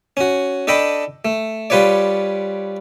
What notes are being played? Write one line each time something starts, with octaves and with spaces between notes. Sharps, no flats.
C#4 F#4
D4 A4 D#5 G5 B5
A3
G3 F4 B4 C#5 D5